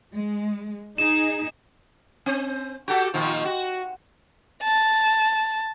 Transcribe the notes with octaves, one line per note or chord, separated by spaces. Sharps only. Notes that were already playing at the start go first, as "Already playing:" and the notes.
G#3
D#4 G#4 E7
C4
F#4 G4 A4
A#2 D#3 F3
F#4
A5